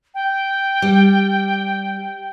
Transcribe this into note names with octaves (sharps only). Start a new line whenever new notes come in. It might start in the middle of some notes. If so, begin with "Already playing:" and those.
G5
G3